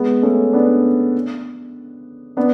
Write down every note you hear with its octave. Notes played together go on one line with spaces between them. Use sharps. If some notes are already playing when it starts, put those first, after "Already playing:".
Already playing: G#3 B3
A3 C#4
B3 D4
B3 D4